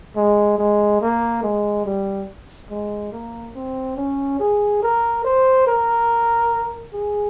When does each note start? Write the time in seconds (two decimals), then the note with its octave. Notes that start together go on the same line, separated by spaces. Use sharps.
0.16 G#3
0.59 G#3
1.01 A#3
1.43 G#3
1.85 G3
2.70 G#3
3.12 A#3
3.55 C4
3.97 C#4
4.40 G#4
4.83 A#4
5.24 C5
5.67 A#4
6.94 G#4